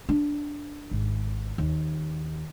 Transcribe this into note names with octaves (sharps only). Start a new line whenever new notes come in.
D4
G#1
D#2